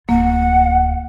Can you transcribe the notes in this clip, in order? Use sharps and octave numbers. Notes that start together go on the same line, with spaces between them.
D1 A#3 F4 F#5